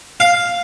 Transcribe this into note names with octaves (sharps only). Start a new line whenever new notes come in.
F5